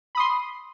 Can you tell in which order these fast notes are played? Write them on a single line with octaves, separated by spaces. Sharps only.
B5 D#6 C6